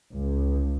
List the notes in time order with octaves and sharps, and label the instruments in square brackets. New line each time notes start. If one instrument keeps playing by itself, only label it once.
[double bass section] C#2